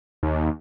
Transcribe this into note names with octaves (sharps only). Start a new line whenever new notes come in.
D#2